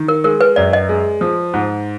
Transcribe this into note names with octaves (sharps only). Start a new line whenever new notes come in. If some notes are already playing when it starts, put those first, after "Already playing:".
Already playing: D#3
A#4
G#3 A#4
B4
F#2 D5
D#5
G#3
F3
G#2